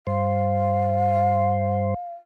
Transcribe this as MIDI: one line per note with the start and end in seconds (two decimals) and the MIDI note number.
0.07 1.94 43
0.07 1.94 72
0.07 2.12 77